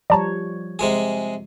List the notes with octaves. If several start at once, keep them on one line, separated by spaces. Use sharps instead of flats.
F3 G3 C#5 D5 A5 A#5
C3 G#3 G#4